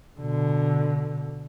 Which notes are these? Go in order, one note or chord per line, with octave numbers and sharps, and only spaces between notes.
B2 D3